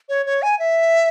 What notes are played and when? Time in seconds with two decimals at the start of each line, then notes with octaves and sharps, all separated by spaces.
0.09 C#5
0.26 C#5
0.42 G#5
0.59 E5